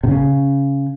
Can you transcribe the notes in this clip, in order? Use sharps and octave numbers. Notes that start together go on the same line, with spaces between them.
C3
C#3